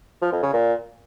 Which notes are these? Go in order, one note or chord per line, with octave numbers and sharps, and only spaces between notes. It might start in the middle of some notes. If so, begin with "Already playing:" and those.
F3
F2
C#3
A#2